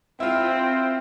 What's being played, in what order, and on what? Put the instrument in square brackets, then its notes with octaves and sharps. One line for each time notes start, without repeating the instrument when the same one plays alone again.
[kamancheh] C4 [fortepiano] E4 F4